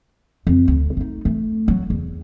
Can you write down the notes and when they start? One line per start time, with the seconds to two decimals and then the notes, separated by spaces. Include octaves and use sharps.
0.47 F2
0.68 D2
0.97 A3 D#4
1.25 A3
1.68 F#3
1.90 E2